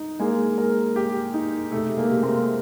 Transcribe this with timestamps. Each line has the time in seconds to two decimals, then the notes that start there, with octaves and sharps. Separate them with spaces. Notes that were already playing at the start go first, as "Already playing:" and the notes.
Already playing: D#4
0.19 G#3 A#3
0.58 A#4
0.96 G4
1.34 D#4
1.72 C3 A3
1.97 G#3 A#3
2.10 C3
2.23 A#3 C4